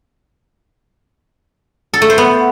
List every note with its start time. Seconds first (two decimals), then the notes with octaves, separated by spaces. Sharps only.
1.94 A4
2.02 A3
2.10 C5
2.18 B3